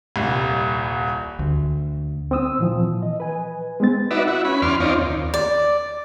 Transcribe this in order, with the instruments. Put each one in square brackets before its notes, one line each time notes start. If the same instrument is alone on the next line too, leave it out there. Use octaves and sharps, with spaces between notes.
[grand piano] D#1 C2
[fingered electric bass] D2
[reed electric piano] C4 C5 D#6 E6
A#2 E3 F3
D#5
B4 G#5
G#3 B3 C4 A6
[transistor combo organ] D#4 F#4 B4 D5 E5
E4 F#4
C#4 B5
E2 C#4 D5 C6 F6
C4 D#4 F4 C#5 D5
D#2
[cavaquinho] D5